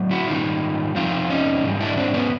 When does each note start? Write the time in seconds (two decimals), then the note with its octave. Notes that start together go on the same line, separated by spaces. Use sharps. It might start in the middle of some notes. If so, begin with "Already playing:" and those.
Already playing: A2 F#3
0.11 E4 F#4
0.28 G#2 D#3 G3 D#4 F4
0.95 F2 C3 F3 D#4 F4
1.30 C#4 D#4
1.63 G#2 E3 G3
1.80 D4 E4
1.97 C4 D4
2.14 B3 C#4